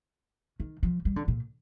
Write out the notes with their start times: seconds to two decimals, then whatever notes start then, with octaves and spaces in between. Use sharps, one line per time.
0.60 D#3
0.83 F3
1.05 G3
1.16 D3
1.28 A#2